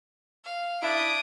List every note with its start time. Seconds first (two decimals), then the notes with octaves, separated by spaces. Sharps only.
0.45 F5
0.83 D4 E4 D#6 D7